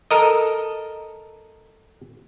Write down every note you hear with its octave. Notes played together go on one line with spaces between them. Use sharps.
A4 A#4 D#5